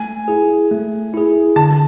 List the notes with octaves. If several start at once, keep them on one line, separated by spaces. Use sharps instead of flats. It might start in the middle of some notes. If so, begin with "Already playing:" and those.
Already playing: A3 G#5
E4 G#4
A3
E4 G#4
D3 A5